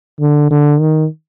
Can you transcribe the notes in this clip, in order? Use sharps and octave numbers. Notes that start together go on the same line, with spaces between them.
D3
D3
D#3